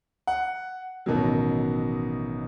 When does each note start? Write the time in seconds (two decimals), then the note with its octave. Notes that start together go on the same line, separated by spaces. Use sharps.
0.27 F#5
1.06 A1 B2 D#3 F#3